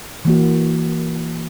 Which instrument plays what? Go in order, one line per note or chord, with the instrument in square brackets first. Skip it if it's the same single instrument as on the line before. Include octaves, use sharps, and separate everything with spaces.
[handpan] E3 A#3 F#4